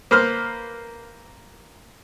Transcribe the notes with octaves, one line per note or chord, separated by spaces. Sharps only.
A#3 B4 C5 F6